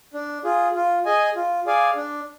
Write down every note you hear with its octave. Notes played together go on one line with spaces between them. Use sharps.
D4
F4 G#4
F4
G#4 D#5 G#5
F4
G#4 D5 F5 G#5
D4